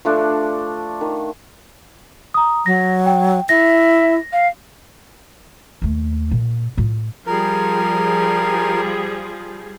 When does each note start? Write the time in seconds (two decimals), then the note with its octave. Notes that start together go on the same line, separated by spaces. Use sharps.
0.05 F3 A3 D4
1.01 D#3
2.34 A#5 D#6
2.66 F#3 A#6
3.06 G5
3.49 E4 E5 A#6
4.32 F5
5.82 D#2 A3
6.31 A#2
6.77 A2 F4
7.26 F3 G3 G#4 A#4